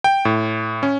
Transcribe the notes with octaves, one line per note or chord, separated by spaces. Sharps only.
G5
A2
C#4